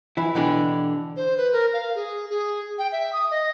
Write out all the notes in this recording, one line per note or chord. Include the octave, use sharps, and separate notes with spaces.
E3 E4
B2 D3 E3 D4 G4
C5
B4
A#4
F5
G#4
G#4
G5
E5
D#6
D#5